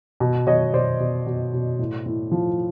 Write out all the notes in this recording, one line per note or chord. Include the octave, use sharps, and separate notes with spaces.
B2
B2 C#5 D#5
B2 C5 D5
B2
B2
B2
A2
A2
F3